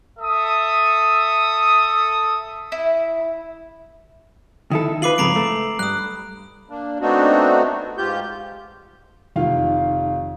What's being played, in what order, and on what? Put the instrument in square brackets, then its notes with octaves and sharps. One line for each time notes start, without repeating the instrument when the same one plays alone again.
[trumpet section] A4 E5 D#6
[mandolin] E4
[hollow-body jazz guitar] D#3 E4 A4
[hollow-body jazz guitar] F4 B4 [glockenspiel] D6 C7 F#7
[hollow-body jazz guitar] F2 G#2 C#3 [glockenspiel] A#5 B5 D7
[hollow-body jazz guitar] A3
[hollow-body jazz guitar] G2 [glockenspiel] D#6 F#6
[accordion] A#3 D4
A3 B3 C4 D4 D#4 F#4
G#2 F4 G4 G6
[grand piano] F1 D#3 F4 F5